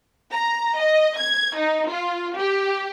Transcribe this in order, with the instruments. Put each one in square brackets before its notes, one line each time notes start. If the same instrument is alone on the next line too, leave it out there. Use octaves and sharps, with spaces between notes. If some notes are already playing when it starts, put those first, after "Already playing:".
[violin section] A#5
D#5
G#6
D#4
F4
G4